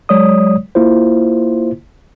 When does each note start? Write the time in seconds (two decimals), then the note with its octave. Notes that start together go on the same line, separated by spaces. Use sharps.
0.09 F#3 G#3 C#5 D5 D#6
0.75 A#3 E4 F4 C5